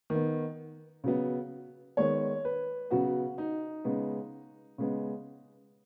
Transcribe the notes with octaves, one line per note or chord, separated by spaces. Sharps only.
D#3 B3
C#3 F#3 B3
D#3 G#3 B3 C#5
B4
C#3 F#3 B3 F#4
D#4
C#3 G#3 B3
C#3 G#3 B3